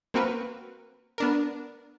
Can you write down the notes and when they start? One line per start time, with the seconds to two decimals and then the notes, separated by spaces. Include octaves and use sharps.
0.14 A#3 C4 F#4 A#4 B4
1.18 B3 D4 A#4